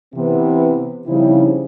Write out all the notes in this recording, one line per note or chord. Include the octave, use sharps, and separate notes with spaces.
C3 E3 B3 C4
C#3 F3 G3 C4 D#4 E4